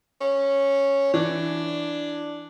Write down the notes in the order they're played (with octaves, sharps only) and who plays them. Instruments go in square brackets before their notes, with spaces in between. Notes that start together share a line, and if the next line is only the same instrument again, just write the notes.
[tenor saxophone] C#4
[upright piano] E3 [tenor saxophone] D4